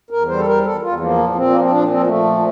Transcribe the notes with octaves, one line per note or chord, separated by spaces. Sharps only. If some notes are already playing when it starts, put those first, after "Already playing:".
E2 A#4
G3 C5
A4
E2 A#4
E2 A4
E2 F4
F3 A#3
A#2
A#2 C4
F3 A#3
C4
A#2 D4
F3 C4
F3 A3
A#2